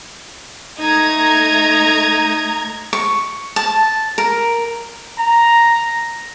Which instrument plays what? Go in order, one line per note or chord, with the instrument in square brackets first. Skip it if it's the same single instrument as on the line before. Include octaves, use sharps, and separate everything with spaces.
[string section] A3 A#5 G#6 [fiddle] D#4
[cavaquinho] C#6
A5
A#4
[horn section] A#5